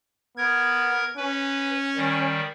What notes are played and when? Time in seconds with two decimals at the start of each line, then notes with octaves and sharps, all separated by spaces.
0.37 B3 A#4 G#6
1.17 C#4 B4
1.97 D#3 G3